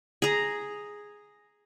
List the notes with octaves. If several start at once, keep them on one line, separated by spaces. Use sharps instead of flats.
G#4 A#5